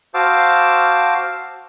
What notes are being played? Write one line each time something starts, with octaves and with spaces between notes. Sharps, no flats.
F#4 C5 F5 A5 D6 E6